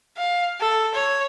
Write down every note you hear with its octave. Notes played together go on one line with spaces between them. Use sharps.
F5
A4
C#5